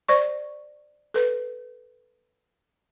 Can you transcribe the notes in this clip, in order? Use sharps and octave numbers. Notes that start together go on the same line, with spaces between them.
C5 D5 C#6
A4 B4